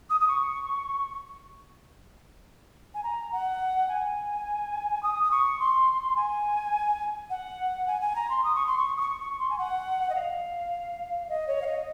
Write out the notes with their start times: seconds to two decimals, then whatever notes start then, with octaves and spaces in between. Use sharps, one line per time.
0.10 D#6
0.20 D#6
0.28 C#6
2.94 G#5
3.03 A#5
3.32 F#5
3.89 G#5
5.03 D#6
5.23 D#6
5.31 C#6
5.60 C6
6.16 G#5
7.30 F#5
7.87 G#5
8.01 G#5
8.16 A#5
8.29 C6
8.43 D#6
8.55 C#6
8.67 C6
8.78 C#6
8.97 D#6
9.00 C#6
9.20 C#6
9.39 C6
9.50 G#5
9.58 F#5
10.10 D#5
10.15 F5
11.29 D#5
11.47 C#5
11.62 F5
11.66 D#5